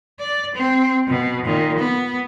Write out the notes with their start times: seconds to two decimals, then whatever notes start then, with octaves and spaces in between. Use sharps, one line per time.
0.19 D5
0.55 C4
1.08 B2
1.45 A#2 D#3
1.78 B3